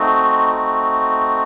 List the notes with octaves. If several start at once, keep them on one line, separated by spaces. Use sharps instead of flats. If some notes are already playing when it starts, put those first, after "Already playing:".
Already playing: A3 C4 D#4 F#4
F#4